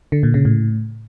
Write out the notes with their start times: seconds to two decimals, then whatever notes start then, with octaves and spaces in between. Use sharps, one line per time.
0.12 D3
0.23 A#2
0.34 C#3
0.45 A2